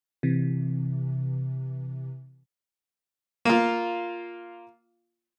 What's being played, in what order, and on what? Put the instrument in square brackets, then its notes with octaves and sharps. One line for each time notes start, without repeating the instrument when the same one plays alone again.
[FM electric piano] C3 E3
[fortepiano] A#3 F4